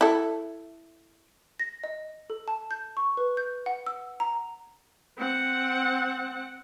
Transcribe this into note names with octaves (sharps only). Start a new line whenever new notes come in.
E4 A4
A#6
D#5
A4
A5
G6
C#6
B4
G6
F#5
E6
A#5
C4 F#5